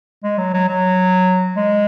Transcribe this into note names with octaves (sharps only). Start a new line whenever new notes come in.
G#3
F#3
F#3
F#3
G#3